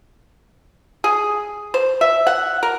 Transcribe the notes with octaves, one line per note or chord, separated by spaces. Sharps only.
G#4
C5
E5
F#5
A#4